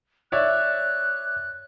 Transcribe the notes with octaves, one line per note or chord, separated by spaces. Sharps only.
C#5 D5 E5 F#6